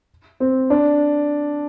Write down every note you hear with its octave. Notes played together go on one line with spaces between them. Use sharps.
C4
D4